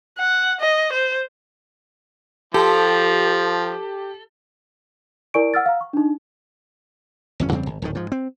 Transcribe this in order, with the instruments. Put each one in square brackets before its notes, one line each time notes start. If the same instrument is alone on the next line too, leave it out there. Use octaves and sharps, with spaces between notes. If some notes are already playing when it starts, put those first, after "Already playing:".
[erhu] F#5
D#5
C5
[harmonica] F3 [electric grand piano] G4 [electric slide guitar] A4
[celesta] E4 A#4 D5 G#5 C#6 D7
F#5 E6 F6 A6
F5 A#5
C#6
D4 D#4
[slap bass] G1 F2 C#4
E2 C#3 G3 C4
G#1
D1 A2 D#3
G#2 F3
C4